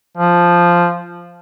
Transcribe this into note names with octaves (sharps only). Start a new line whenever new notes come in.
F3